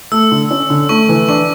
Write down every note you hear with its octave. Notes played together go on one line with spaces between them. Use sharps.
A3 E6
D3
C#4
D3
A3 C#6
E3
D4 C#6